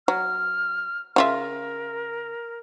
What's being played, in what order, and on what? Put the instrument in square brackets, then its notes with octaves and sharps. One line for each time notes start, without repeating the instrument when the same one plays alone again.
[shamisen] F#3 [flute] F6
[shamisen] C#3 F4 E5 [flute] A#4